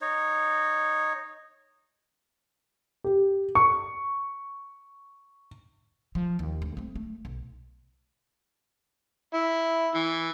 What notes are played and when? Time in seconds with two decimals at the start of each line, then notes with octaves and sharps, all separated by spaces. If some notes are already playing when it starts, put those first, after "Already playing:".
0.01 D#4 C#5
3.04 G4
3.55 C#6
6.15 F3
6.39 D#2
6.62 D2
6.77 A3 C4
6.95 A3
7.25 B1
9.34 E4
9.95 E3